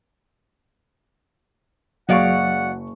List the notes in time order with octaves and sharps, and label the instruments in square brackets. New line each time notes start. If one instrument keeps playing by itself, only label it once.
[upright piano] F#1 G#4 C#6 [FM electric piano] F#3 [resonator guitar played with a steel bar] G#3 D5 F5 [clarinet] F#5